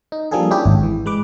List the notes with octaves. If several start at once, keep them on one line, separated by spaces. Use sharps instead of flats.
D#4
F3 G3 A#3 D4 G#4 A4
C#4 D4 E4 G4 G#4
G#1 G#4
E3
G#3 B4 D6